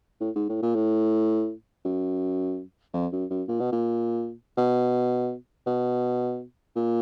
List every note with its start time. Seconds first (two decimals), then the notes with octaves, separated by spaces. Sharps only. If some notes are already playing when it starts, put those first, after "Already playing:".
0.21 A2
0.36 G#2
0.49 A2
0.63 A#2
0.75 A2
1.85 F#2
2.94 F2
3.12 F#2
3.30 F#2
3.48 A#2
3.60 B2
3.72 A#2
4.58 B2
5.67 B2
6.76 A#2